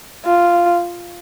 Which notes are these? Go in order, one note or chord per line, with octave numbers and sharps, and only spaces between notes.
F4